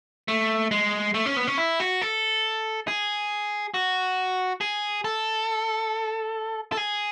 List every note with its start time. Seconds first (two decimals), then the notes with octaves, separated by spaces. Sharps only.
0.28 A3
0.71 G#3
1.14 A3
1.26 C#4
1.36 B3
1.47 C#4
1.58 E4
1.80 F#4
2.02 A4
2.88 G#4
3.74 F#4
4.61 G#4
5.05 A4
6.72 A4
6.77 G#4